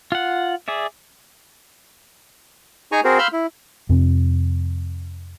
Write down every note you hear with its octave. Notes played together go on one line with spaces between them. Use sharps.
F4 F#5
G#4 D5 E5
D#4 G#4 G#5 A#5 C#6
C4 F#4 G#4 A#4 C5
F5 B5 C6 E6 F6 G6
E4
F2 C3 C4